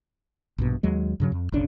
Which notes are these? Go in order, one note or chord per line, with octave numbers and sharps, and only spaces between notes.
A#1 G2 B2
D#2 F#3 G#3
G2 C#3 F#3
F2
F#1 B1 C#3 D4